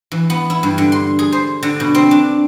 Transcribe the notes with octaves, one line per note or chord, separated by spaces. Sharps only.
E3
B3
E4
G2
D3
C6
G#4
C5
D3
B2
C4
D4